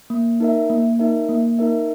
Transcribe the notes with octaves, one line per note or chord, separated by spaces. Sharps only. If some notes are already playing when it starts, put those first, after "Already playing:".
A#3
D#4 A#4 E5
A#3
D#4 A#4 E5
A#3
D#4 A#4 E5